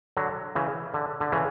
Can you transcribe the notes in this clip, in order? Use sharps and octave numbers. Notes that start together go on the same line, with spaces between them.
D3 F#3
C#3 E3
D3
D3
C#3 E3